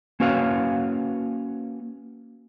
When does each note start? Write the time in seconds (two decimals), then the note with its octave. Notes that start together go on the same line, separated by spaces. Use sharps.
0.20 A#3 C#4 F#4 B4 C#5 F5